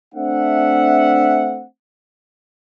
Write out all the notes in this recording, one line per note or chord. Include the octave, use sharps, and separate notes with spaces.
A3 C4 D4 E5 F#5